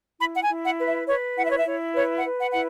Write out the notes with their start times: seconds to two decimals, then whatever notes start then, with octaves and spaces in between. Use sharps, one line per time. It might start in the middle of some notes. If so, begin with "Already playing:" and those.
0.19 E4 B5
0.34 F#5
0.42 G#5
0.49 E4
0.63 F#5
0.78 B4
0.86 E5
1.07 B4 C#5
1.36 E4 F#5
1.44 E5
1.50 C#5
1.58 E5
1.65 E4 C#5
1.94 B4 C#5
2.16 F#5
2.24 B4
2.39 F#5
2.51 E4 F#5